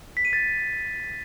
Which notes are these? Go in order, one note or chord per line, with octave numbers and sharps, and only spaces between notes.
B6
D#7
A6